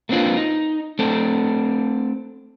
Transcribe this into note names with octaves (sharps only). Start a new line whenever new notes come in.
A3 A#3 C4 D4 F4 B4
D#4
A3 C4 D4 A4